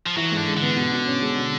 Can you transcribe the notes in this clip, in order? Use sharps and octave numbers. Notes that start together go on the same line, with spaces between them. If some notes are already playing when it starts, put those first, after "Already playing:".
F3
E3 F#3
G#2
D3
G#3
D3
B3
B2
B2
C#4
G#3
B2